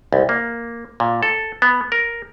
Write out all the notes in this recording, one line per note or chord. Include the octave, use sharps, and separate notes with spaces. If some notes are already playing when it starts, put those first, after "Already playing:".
C2
A#3
A#2
A4
B3
A#4